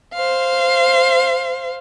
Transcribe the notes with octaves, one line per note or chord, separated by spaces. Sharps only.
C5 F5